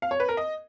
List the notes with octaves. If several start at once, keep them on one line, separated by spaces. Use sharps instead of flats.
F5
C#5
B4
A#4
D#5